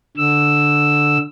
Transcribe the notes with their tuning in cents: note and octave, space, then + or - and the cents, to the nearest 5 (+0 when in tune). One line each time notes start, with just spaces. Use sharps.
D3 +0 E6 +0